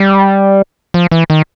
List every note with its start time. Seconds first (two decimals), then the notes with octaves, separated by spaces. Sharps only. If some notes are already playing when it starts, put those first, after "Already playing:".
Already playing: G3
0.94 F3
1.11 E3
1.30 D#3